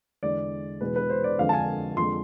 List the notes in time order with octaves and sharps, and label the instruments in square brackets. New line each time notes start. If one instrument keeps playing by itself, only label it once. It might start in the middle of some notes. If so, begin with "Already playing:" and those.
[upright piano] E2 D3 G#3 D5
E2 B2 G#3 B4
B4
C5
D5
F2 D3 G#3 F5
A5
G#5
F2 D3 G#3 C6